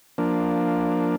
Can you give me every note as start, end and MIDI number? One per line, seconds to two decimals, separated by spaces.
0.18 1.16 53
0.18 1.16 58
0.18 1.16 62